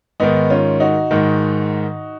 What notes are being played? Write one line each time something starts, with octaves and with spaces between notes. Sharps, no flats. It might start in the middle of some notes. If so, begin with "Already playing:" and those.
G#2 D#3 B3 D#4
C#4 F4
D#4 F#4
G#2 D#3